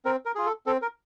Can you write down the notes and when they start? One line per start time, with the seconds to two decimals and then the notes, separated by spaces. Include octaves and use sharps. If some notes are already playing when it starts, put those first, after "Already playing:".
0.05 C4 A#4
0.25 A#4
0.35 F4 G#4
0.46 A4
0.66 C4 A4
0.82 A#4